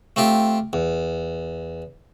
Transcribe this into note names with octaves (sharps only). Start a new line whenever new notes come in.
A3 C4 F4 G4
E2